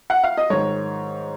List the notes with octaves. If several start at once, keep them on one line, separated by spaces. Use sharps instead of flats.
F#5
F5
D#5
G#2 D#3 C#5